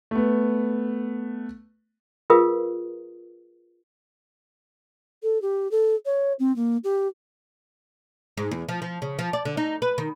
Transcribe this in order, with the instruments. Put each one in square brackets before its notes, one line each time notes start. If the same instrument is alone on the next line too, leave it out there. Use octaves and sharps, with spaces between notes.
[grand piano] A3 B3
[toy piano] F4 G#4 A#4 B4 F5 D#6
[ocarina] A4
G4
A4
C#5
C4
A#3
G4
[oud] G#2
E2
F3
F3
C#3
F3
D5
D3
D#4
B4
D#3